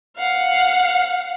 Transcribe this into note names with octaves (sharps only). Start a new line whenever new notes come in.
F5 F#5